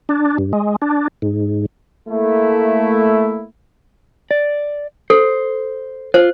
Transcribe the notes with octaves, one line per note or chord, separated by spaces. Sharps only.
D4
G2
G#3
D4
G#2
A3 A#3 E4
D5
A4 C5
F4 C5